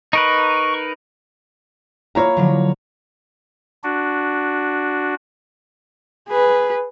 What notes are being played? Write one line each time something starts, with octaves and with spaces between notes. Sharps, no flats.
D#4 A#4 B4 C#6
A#3 E4 F4 C#5 A#5
D3 F3 F#3
D4 F#4
G#4 B4